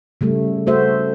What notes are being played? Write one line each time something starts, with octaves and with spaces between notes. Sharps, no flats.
C#3 G3 A3
A3 F#4 C5 E5